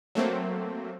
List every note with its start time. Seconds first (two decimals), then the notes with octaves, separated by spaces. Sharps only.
0.15 F#3 A3 A#3 C4